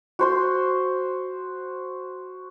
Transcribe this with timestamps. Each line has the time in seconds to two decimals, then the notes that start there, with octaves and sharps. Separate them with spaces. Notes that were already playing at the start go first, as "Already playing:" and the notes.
0.19 F#4 C5 C6